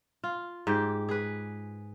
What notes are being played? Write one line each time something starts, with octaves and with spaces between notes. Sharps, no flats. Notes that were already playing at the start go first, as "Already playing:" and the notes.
F4
G#2 G4 G5
G#4 B4